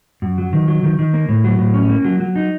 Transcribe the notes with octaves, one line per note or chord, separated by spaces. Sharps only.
F#2
F#3
D#3
F#3
D#3
D#3
A#3
A2
F#3
A2
C#4
A#3
F#3
F#3
D#4